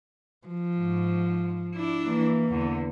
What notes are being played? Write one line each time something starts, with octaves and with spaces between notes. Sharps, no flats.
F3
G#2
D4 E4
E3 A#3
E2 D3